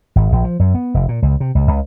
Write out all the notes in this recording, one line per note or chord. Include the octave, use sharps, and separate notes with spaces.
G#1
A#1
F3
F#2
B3
F1
A#2
C#2
C3
C#2
C#2